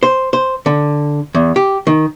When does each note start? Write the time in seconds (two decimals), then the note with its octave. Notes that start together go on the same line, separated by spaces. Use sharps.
0.03 C5
0.33 C5
0.66 D3
1.35 E2
1.56 G4
1.87 D#3